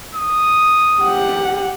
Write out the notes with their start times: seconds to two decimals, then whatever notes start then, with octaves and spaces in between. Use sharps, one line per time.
0.15 D#6
1.02 G4 F#5